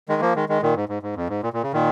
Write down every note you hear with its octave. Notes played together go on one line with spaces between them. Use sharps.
D#3 G#3
F3 A#3
D#3 G#3
D#3 G#3
A#2 D#3
G#2
G#2
G#2
F2
G#2
A#2
A#2
C#3
A#2 D#3